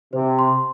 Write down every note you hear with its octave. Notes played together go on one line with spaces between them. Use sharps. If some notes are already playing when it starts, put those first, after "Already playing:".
C3 C5
C6